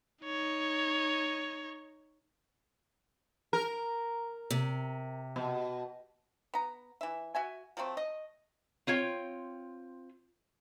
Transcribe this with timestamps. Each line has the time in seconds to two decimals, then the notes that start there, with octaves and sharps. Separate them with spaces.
0.24 D#4 C#5
3.53 A#4
4.51 C3
5.36 B2
6.54 B3 A#5
7.01 E3 E5
7.35 F#4 E5 G#5
7.77 F3 F#3 A3 C4
7.97 D#5
8.87 C4 F4 C#5 G5